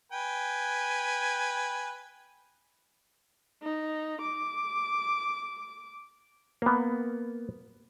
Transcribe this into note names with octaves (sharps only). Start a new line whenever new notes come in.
B4 G5 G#5
D#4
D6
A#3 B3